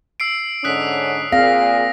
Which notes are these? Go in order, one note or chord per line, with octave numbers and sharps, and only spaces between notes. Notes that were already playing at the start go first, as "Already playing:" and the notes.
E6 C7 D7
G#2 D3 C#4 D#6 F#6 B6
A#2 C4 G#4 F5 A#6